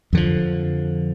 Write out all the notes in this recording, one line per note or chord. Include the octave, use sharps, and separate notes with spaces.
F2 D3 F3